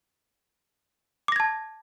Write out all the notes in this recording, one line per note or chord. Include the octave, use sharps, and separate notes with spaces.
A5 D6 G#6 A#6